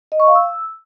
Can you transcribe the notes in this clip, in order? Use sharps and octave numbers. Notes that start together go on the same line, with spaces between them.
D#5
C#6
F5
E6